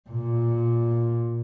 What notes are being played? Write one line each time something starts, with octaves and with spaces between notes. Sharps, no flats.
A#2